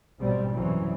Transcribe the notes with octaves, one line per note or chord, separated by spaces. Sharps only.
A1 G#2 B2 G3 C4
C2 F#2 E3 F#3 C4